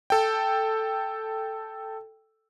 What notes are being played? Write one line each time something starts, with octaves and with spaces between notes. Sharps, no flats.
A4 G5